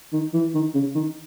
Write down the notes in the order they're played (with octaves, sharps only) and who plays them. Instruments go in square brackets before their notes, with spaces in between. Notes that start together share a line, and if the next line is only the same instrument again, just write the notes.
[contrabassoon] D#3
E3
D#3
C#3
D#3